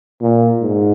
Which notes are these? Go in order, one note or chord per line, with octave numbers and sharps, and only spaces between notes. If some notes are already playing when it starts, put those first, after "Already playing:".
A#2
G#2